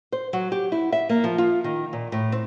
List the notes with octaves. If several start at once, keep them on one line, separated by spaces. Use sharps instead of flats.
C5
F#3
G4
E4
E5
A#3
F3
F4
D#3
A#2
A2
C4